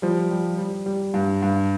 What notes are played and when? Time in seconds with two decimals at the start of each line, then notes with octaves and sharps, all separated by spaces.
0.02 F3 G3
0.31 G3
0.58 G3
0.86 G3
1.14 G2
1.42 G2